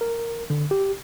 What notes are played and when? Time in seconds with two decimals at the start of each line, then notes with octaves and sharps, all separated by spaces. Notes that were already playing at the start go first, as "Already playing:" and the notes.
0.01 A#4
0.50 D3
0.71 G4